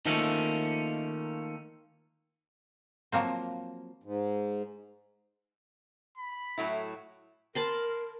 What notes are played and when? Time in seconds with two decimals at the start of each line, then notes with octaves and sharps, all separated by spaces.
0.06 D#3 F3 A3 A#3 C#4
3.12 F3 F#3 A#3 C4
4.04 G#2
6.18 B5
6.58 A2 F#3 E4
7.55 A#4 A5 B5 C6